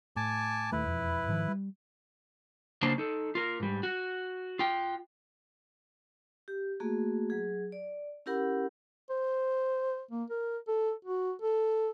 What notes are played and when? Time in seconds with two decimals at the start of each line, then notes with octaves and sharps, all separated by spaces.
0.16 A2 G#5 A5 D6
0.72 D#1 D#2 A3 E4 B4
0.86 E1 F2
1.28 G#2 D#3 F3
1.48 G3
2.82 C#3 F#3 A#3 D4 C5 A5
2.98 D#4 A4
3.35 F4 A#4
3.60 G#2 G3
3.83 F#4
4.59 F4 G5
6.48 G4
6.80 A3 A#3 F#4 G#4
7.30 F#3 G#4
7.72 D5
8.26 C#4 E4 G4 A#4 F#5 B5
9.10 C5
10.11 A#3
10.30 A#4
10.68 A4
11.05 F#4
11.42 A4